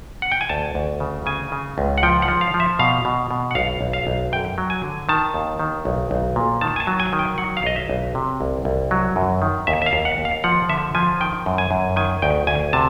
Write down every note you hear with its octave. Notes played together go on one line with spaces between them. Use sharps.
F#5
G5
G#5
D2 A5
D2
C#3
C#3 G#5
C#3
C#2
F#5
F3 G5
F#5
F3
F5
F3
E5
B2 F5
B2
B2
F#5
B1 F5
B1
F5
B1
F#2 G5
F#3
G#5
D3
D#3 A5
D#2
D#3
B1
B1
A#2
D#3 A5
G#5
A5
F#3
G#5
D#3
G5
F#3 F#5
F5
B1 D#5
E5
B1
C3
C2
C2
F#3
F#2
D#3
D#2 E5
E5
F5
D#2
F#5
D#2
F5
F3 F#5
D3 E5
F3 G#5
D#3 G5
F#2
G#5
F#2
D#3 G#5
D2 G5
D2 G#5
C3 A5